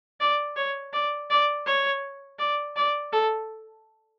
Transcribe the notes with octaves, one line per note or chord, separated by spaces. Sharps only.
D5
C#5
D5
D5
C#5
D5
D5
A4